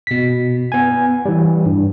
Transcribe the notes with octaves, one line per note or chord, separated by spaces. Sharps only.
B2 B6
B3 G#5
E3 G3
G2